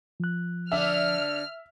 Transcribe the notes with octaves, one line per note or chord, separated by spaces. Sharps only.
F3 F#6
D3 D4 E5 F6